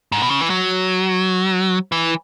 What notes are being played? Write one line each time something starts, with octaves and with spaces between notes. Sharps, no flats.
G#2
B2
C#3
E3
F#3
E3